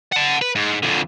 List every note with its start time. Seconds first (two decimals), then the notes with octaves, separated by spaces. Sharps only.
0.12 F#5 A5
0.42 B4
0.55 G#2
0.83 F2 D3